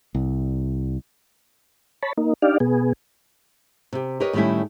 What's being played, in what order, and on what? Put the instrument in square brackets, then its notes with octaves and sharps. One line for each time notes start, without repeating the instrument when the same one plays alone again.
[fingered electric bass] C2
[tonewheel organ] C#5 A5 B5
A#3 D#4
D4 D#4 G4 D5 F5
B2 B3 G#4
[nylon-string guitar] C3 G4
G4 A#4 B4 C#5 D#5
A2 D#3 G3 A3 C#4 E4